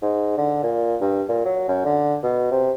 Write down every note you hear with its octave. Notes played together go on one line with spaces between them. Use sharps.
G#2
D3
A#2
G2
A#2
F#3
F#2
D3
B2
C3